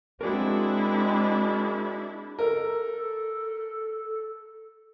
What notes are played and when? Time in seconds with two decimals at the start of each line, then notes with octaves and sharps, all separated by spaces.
0.21 G#3 C4 D4 E4 F#4 G#4 A#4
2.39 A4 A#4